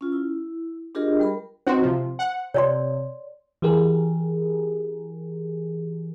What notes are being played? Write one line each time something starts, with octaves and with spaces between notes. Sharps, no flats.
C#4 F4
E4
D4 F4 G4 G#4 A#4 D#5
G3 A#4 B5
C4 D#4 F#4 C5 C6
C3 F3
F#5
C3 C#5 D5 C6
E3 G4 G#4 A#4